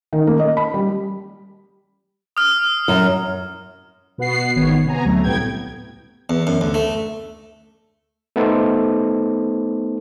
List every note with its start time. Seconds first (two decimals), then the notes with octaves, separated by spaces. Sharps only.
0.13 D#3
0.27 A#3
0.40 D#5
0.57 B5
0.74 G3
2.37 D#6 F6
2.88 F#2
4.18 B2 B3 F#4 F#5 C7
4.56 G#1 D#3 B3 C#5
4.85 C3 B3 G#5 A#5
5.05 D2 F#3 A3
5.24 C2 A2 C3 B3 G5 G#6
6.30 E2
6.47 F#2
6.61 D2
6.74 A3
8.36 A3 B3 D#4 A4 C5